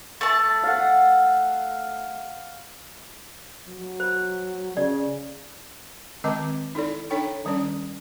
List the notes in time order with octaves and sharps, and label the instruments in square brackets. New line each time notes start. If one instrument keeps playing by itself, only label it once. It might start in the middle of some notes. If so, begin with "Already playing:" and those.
[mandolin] A3 A5
[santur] F5 F#5
[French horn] F#3
[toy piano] C5
[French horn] C#3 [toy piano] D5
[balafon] D#3 G#3 C4 D#5 A5 D6
D#4 E4 A4 D5
D4 D#4 A4 C#5 G5 C#6
D#3 G3 C#4 D5